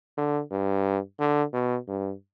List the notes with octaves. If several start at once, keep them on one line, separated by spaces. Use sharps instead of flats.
D3
G2
D3
B2
G2